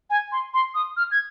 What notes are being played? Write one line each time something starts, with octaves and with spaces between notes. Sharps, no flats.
G#5
C6
C6
D#6
F6
G#6